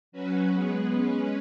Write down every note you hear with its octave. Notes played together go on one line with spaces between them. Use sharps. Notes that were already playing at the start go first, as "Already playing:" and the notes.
F#3 C#4 F#4 B4
G#3 B3 G#4 B4
G#3 C#4 B4